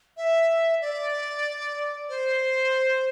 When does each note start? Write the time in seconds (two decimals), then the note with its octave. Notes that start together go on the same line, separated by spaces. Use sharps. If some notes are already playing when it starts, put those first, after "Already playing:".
0.17 E5
0.81 D5
2.09 C5